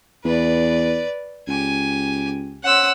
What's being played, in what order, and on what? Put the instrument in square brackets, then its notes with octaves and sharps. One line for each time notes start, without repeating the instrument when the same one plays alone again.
[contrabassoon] E2 [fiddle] B4 D5
[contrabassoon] C#2 [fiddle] G4 G#5
[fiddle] C#4 C5 [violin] F#5 E6